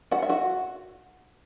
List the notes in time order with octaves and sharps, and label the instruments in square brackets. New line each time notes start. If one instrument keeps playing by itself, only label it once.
[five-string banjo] F#4 F#5
E5
F#4 F#5